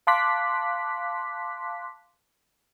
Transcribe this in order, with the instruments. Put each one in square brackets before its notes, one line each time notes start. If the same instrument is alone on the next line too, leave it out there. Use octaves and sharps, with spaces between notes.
[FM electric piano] F5 A5 C6 D6 F#6 B6